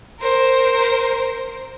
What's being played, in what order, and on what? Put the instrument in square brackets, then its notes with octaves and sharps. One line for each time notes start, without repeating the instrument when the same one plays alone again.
[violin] A#4 C5